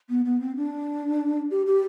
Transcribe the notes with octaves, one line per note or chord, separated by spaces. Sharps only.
B3
B3
C4
D4
G4
G4